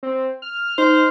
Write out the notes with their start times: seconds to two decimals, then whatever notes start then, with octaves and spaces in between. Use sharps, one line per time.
0.03 C4
0.42 F6
0.78 D#4 C5